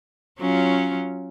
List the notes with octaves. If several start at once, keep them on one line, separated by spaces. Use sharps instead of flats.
F#3 C#4 F4